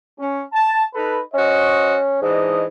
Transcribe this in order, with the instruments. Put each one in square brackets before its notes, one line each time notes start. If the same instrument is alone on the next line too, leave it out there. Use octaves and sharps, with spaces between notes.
[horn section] C#4
A5
D#4 A4 B4
[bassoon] C#4 [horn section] F#4 C5 D#5
[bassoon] G#2 [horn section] E3 D4 D#5